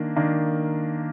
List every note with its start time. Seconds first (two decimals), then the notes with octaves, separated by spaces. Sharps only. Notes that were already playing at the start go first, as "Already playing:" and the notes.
Already playing: D#3 A#3 D4
0.16 D#3 A#3 D4